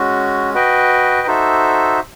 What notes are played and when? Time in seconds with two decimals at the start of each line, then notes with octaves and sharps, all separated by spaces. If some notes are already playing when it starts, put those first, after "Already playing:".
Already playing: G#3 C#4 F#4
0.54 F#4 B4 D#5 G5
1.27 D#4 F#4 A4 C5 E5